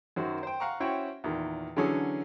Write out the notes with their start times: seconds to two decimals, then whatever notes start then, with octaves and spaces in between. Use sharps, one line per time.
0.16 F#2 D#3 F#3 F#4 C5
0.43 C5 G5
0.60 F5 F#5 A#5 C#6
0.80 C#4 E4 F#4 C5 C#5 G5
1.24 E2 A#2 D#3
1.76 D3 E3 F#3 C#4 G#4 A4